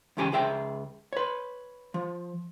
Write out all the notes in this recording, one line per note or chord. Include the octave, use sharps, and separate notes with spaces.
E2 G#2 C#3 G4 A#4 G#5
C#2 G#4 E5 G5
B4 C#5
F3